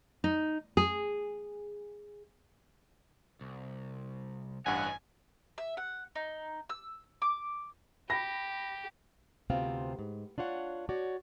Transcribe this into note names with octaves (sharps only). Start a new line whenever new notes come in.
D#4
G#4
C2
A1 G2 C#5 D#5 F#5 G#5 F#6
E5
F#5
D#4
E6
D6
G4 B5 A#6
D2 C3 B3 C4 F4 F5
G#2
D4 F4 C#5 F#5
F#4 C#5 D5